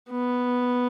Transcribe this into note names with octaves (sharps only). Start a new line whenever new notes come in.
B3